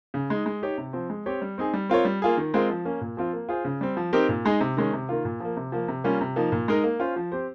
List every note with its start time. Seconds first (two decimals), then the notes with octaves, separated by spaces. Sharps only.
0.14 C#3
0.30 G#3 D#4
0.46 G#3
0.62 D#4 G4 C#5
0.78 C3
0.93 F3 C4
1.10 G#3
1.26 C4 G4 C#5
1.42 G3
1.58 C4 D#4 G#4
1.74 G3
1.89 C4 F4 A#4 C#5
2.05 G3
2.22 A#3 F4 G#4
2.37 D#3
2.54 G#3 C4 F4 A#4
2.70 F3
2.85 A#3 C#4
3.01 A#2
3.17 F3 C4 F4
3.33 A#3
3.49 F4 G#4 C5
3.65 C#3
3.81 G3 C4
3.97 F3
4.13 C4 D#4 G4 A#4
4.29 A#2
4.45 G#3 D#4 G#4
4.60 C3
4.77 D#3 G#3 C#4
4.93 C3
5.09 D#3 A#3 F4
5.25 A#2
5.40 F3 A#3
5.57 C3
5.72 F3 A#3
5.88 C3
6.04 G3 A#3 C#4 F4
6.21 C3
6.36 F3 A#3 D#4
6.52 A#2
6.68 G#3 D#4 A#4
6.84 A#3
7.00 C#4 F4 C5
7.16 F3
7.32 C4 G4 C5